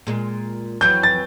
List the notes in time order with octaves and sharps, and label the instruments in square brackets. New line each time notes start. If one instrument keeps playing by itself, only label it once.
[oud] A#2 G#3
[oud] F2 E3 F#3 [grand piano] G6
[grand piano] A6